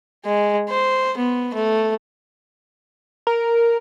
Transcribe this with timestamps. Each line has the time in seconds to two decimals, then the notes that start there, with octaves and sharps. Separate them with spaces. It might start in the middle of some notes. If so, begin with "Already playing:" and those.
0.25 G#3
0.69 C5
1.17 B3
1.54 A3
3.27 A#4